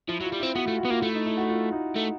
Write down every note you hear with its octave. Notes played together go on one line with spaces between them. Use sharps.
F3 E4
F#3
F4
G3
C4 E4
B3 F#4
A3 F4
F#4
B3
A#3 F4
A3 E4
D#4
E4
F#4
F4
D#4
A3